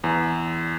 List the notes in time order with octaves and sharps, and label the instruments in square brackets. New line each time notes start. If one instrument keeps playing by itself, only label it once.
[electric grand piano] E2